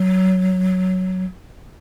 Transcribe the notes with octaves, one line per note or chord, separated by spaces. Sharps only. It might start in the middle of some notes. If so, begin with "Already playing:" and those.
Already playing: F#3